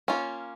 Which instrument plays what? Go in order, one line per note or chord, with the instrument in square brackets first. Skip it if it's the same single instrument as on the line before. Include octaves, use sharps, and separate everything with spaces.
[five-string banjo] A#3 C#4 F4